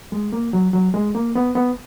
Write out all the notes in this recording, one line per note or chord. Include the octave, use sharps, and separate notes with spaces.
G#3
A#3
F#3
F#3
G#3
A#3
B3
B3